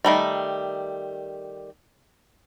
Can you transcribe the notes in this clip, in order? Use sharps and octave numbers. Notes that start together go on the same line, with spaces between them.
D#3 G3 A3